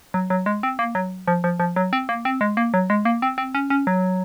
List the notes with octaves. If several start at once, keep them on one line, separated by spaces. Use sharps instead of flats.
F#3
F#3
G#3
C4
A#3
F#3
F3
F3
F3
F#3
C4
A#3
C4
G#3
A#3
F#3
G#3
A#3
C4
C4
C#4
C#4
F#3